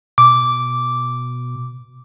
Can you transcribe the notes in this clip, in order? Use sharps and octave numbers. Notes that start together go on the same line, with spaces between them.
B2 D6